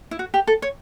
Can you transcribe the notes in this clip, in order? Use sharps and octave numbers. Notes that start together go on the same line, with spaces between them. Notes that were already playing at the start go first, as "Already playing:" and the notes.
E4
F#4
G4
A4
C#5